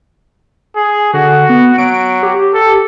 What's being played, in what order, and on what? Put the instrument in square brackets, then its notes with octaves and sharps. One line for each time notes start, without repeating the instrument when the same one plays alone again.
[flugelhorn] G#4
[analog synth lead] D3 [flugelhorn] F#4
[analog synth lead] B3
[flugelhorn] F#3 [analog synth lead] D7
[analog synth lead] G4
[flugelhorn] A4